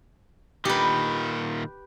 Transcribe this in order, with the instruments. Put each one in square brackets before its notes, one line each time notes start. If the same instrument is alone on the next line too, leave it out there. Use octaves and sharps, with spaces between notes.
[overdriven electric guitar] A#2 D#3 [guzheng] G4 B4